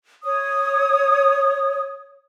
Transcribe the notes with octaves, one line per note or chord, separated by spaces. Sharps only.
C#5 D#6